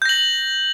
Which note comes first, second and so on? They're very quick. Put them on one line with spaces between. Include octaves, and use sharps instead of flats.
G6 A#6 F#7